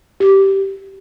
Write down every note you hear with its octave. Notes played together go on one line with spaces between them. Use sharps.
G4